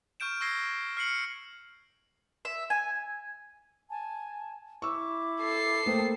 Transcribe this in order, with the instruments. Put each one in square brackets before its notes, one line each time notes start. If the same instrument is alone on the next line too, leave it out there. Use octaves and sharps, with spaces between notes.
[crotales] C#6 F6 G6 D7 E7
C#6 E6 G#6 A#6 C7 G7
F6 C7 C#7 F#7
[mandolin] E5
G#5
[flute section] G#5 A5
[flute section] E4 D6 [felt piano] C#6 E6
[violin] A4 C7
[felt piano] A3 A#3 C5 [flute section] G5 D#6